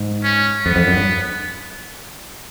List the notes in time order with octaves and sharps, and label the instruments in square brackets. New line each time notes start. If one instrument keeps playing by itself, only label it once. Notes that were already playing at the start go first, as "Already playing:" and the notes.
Already playing: [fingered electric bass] G#2
[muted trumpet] C#4
[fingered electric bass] F2 [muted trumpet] B3
[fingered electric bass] F2
F#2
G2